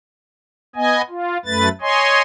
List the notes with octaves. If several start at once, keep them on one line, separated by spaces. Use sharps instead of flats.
B3 D#5 G#5
F4
F#2 A3 B4 A6
C#5 D#5 G#5 C6